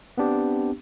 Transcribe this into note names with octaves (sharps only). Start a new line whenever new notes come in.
B3 C4 D4 G4